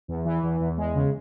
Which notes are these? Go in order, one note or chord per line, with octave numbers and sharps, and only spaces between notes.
E2
E3
E2
E2
G#3
C#3